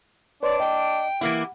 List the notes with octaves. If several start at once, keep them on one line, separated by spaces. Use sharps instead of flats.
D4 B4 C#5 D5 C6
D#5 G5
E3 A#3 E4 G4 F#5